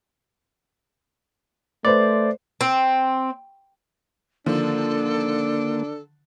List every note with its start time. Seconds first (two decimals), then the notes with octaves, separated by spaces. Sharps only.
1.85 A3 B4 C5 D5
2.61 C4
4.46 D3 D#3 F3 A#3 D4 A4